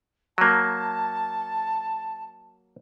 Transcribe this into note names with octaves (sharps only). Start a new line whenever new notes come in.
F#3 A#3 A5